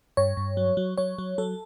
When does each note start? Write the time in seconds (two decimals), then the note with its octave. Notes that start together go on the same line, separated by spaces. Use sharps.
0.17 G2 C#5
0.37 G2
0.57 F#3
0.77 F#3
0.98 F#3 C#5
1.18 F#3
1.38 F#3 A4